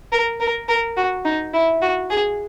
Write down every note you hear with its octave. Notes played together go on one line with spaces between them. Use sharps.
A#4
A#4
A#4
F#4
D#4
E4
F#4
G#4